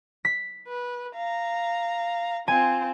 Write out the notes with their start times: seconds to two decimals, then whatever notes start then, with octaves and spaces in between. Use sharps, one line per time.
0.25 B6
0.68 B4
1.15 F5 A#5
2.48 C4 F4 G#5